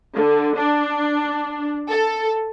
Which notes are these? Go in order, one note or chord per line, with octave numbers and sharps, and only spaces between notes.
D3
D4
A4